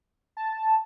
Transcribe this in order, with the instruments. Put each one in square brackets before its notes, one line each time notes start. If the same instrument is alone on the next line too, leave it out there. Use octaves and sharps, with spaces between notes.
[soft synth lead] A5